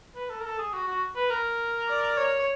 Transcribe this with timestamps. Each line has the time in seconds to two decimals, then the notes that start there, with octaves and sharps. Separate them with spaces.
0.16 B4
0.30 A4
0.40 A#4
0.45 A4
0.59 G#4
0.73 F#4
0.88 F#4
1.16 B4
1.30 A#4
1.88 D5
2.17 C#5